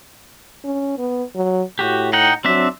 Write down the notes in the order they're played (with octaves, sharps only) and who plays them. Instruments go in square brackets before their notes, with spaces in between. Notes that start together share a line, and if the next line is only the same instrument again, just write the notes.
[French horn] C#4
B3
F#3
[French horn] A2 [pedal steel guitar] F#4 G4
[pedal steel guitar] D#4 F#5 G5
[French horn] F#3 [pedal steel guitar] C4 D4 E5